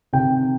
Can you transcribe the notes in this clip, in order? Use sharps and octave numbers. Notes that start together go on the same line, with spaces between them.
C3 D#3 G5